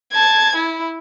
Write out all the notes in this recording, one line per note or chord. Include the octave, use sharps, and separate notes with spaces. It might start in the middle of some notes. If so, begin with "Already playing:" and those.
A5 G#6
E4